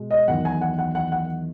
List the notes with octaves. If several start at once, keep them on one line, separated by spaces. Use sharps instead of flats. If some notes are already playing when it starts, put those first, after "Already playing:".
Already playing: B2 G#3
D#5
E2 D#3 F#3 F#5
G#5
F#5
F#5
F#5
F#5